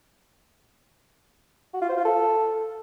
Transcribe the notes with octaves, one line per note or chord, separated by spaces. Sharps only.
F#4
F4
C5
F4
A4